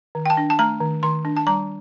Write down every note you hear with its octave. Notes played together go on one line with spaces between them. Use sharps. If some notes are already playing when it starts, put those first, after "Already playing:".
D#3
G5
A5
D4
A5
A3 A#5
D#3
D#3 C6
D4
A5
G3 A#5